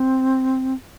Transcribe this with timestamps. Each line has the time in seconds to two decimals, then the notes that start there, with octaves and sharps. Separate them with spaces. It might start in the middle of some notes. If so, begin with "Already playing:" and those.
Already playing: C4